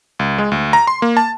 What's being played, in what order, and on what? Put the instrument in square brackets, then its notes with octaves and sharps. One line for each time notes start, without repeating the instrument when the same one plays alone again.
[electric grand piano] C#2
G#3
D2
A#5
C6
A#3
A5